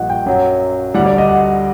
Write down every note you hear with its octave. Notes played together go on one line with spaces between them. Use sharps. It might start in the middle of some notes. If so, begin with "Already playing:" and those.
Already playing: A#1 A#2 G3 D#5 F#5
G5
F#2 F#3
D2 D3 G3 F#5
D5
D#5
F#5